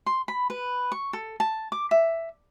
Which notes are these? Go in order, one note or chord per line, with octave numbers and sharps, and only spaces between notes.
C6
B5
B4
C#6
A4
A5
D6
E5